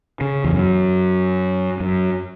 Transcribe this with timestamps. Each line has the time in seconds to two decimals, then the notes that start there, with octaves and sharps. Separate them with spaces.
0.21 C#3
0.44 E2
0.53 F#2
1.80 F#2